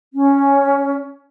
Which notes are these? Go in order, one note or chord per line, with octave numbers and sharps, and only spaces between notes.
C#4